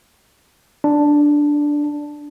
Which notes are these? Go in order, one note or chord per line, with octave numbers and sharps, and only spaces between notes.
D4